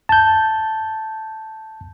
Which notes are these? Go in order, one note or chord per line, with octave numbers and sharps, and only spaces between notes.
A5 G6